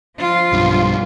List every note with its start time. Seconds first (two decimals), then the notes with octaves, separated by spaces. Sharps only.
0.18 F3 F4
0.52 B1 G2